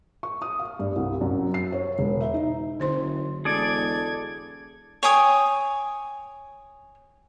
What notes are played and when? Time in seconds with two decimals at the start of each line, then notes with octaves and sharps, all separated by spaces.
0.23 C#6
0.42 D#6
0.59 F5
0.79 G2
0.96 C2
1.21 F#2
1.54 C7
1.72 C#5
1.99 E1
2.21 E5
2.34 D#4
2.80 F#1 D3 C5 C6
3.45 E1 G#4 A4 D5 G#6
5.03 C#5 G5 G#5 D#6